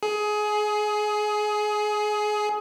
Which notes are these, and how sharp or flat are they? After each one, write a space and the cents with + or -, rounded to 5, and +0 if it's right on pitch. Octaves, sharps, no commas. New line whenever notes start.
G#4 +20